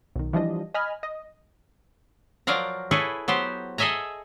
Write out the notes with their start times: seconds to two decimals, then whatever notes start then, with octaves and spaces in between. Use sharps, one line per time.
0.16 B1 D#3
0.33 E3 F3 G3 D4 D#5
0.74 D#5 G#5 B5 F6
1.03 D#5
2.47 F3 F#3 A#4 D5 F5 A#5
2.91 E4 G#4 A4 B4 C#5
3.28 F#3 B3 G4 C5
3.78 G#4 A4 D#5 E5 G#5 A#5